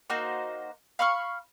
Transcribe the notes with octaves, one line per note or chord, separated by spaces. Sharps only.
A#3 D#4 F#4 C5
F5 B5 C#6 F6